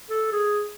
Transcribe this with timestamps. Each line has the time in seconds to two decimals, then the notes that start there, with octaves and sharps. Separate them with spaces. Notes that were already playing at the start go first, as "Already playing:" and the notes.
0.10 A4
0.32 G#4